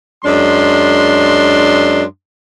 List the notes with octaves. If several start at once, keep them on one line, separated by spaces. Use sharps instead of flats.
F#2 G#3 D4 C6